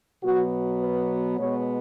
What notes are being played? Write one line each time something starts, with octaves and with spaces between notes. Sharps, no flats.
B2 F#3 B3 F#4
B4
B2 G#3 B3 C#5